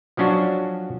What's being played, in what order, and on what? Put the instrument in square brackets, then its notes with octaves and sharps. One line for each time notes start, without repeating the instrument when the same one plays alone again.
[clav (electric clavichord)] F3 F#3 C#4 D4 F#4